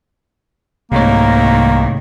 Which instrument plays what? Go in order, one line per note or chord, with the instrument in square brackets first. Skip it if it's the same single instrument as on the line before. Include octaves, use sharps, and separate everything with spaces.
[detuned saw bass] C2 [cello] G#2 D#3 [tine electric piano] C3 A3 C#5 [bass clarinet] A#3